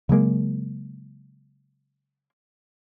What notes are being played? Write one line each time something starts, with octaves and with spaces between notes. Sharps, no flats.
C#3 F#3 G#3 A#3